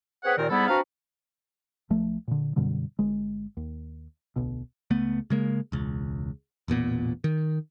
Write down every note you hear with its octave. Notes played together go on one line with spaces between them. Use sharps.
C4 G#4 B4 C#5 F#5
D#2 A#2 D#3 C4 A#4 D5
G#2 G3 B3 E4 A4 B5
C4 D4 F#4 B4 F5 A#5
B1 F3 A3
A#2 D3
F#2 B2 D3 G3
G1 G#3
D#2
D1 B1 B2
C#2 A3 B3
C#3 G#3 A#3
E1 C#2
E1 A1 A#2 B3
D#3